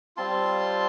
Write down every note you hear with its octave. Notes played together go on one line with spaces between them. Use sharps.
G3 C4 F4 A5 C6